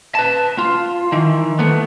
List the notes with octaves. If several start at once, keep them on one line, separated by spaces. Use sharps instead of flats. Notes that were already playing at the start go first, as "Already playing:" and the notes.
B4 A5
F4
D#3 E3
A3 B3